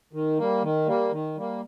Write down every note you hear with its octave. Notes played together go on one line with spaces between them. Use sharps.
D#3
G3 A#3
D#3
G3 A#3
D#3
G3 A#3